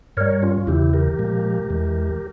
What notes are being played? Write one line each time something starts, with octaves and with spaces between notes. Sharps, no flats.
G2 G3 A#4 C#5
C#4 F4
E2 C#3 E3 E4 G4
G4 A#4
A#2 F3 G#3
E2 E3 G#3